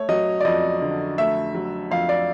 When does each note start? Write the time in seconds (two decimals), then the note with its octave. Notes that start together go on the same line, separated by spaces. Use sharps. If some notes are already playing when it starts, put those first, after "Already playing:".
Already playing: A3 C#5
0.09 F#3 D#5
0.41 D5
0.45 F2 D#5
0.82 D3
1.18 A3 E5
1.55 F#3
1.91 F2 F5
2.09 D5